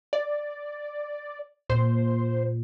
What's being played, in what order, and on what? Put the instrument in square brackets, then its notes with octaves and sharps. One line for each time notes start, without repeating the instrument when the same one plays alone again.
[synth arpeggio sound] D5
[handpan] A#2 [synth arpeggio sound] C5